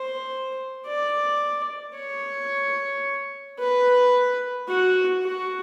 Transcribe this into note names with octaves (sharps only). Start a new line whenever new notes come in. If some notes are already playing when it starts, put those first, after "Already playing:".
Already playing: C5
D5
C#5
B4
F#4
F#4